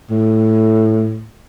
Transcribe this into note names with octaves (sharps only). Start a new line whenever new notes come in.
A2